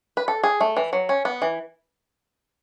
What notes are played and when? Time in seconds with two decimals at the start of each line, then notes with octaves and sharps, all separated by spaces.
0.17 B4
0.28 A4
0.43 G#4
0.61 A3
0.77 E3
0.93 F#3
1.09 C#4
1.25 B3
1.42 E3